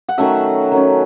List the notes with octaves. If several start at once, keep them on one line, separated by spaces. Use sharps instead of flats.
F#5
D#3 F#3 A3 C#4 E5
D#3 F#3 C#4